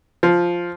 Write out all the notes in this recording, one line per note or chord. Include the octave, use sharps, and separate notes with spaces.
F3